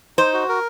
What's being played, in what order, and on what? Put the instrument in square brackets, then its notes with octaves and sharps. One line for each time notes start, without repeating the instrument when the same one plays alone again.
[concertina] D#4 [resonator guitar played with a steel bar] C5
[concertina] F#4
A#4